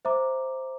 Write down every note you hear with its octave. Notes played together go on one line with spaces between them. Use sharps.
C5 E5 A#5 D6